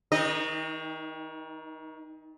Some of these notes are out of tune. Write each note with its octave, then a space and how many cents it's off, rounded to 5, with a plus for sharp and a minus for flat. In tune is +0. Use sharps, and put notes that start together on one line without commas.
D#3 +35 D#4 +0 D#5 -30